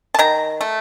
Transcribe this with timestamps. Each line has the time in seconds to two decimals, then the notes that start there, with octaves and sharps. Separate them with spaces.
0.14 A5
0.19 D#3 A#5
0.61 A3